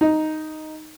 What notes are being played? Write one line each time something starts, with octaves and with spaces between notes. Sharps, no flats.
D#4